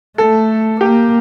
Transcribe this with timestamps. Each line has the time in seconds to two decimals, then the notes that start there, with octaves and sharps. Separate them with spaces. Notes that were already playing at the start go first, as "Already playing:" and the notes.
0.18 A3 A4
0.80 A#3 G4